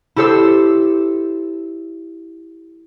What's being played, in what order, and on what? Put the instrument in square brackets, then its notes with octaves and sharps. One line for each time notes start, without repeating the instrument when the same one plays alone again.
[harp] E4 G4 A4 C5 E6